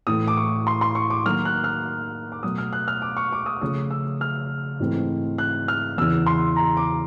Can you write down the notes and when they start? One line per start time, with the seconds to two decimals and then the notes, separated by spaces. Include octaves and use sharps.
0.07 A2 E3 A3 D#6
0.28 D6
0.37 C#6
0.67 C6
0.81 C6
0.95 C#6
1.10 D6
1.26 D#3 F#3 A#3 F6
1.45 F#6
1.64 F6
2.32 D6
2.43 B2 F#3 A3 D#6
2.58 F6
2.73 F#6
2.88 F6
3.02 D6
3.17 C#6
3.32 D6
3.46 D#6
3.61 C#3 F3 A3 C#4 D#6
3.91 E6
4.21 F6
4.80 G#2 E3 A3 C4
5.38 F#6
5.68 F6
5.98 E2 C#3 E3 E6
6.26 C6
6.56 A#5
6.77 D6